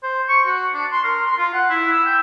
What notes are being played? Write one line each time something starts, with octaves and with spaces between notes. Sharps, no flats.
C5
C#6
F#4
D4
C6
A#4
C6
F4
F#5
E4
E6
G5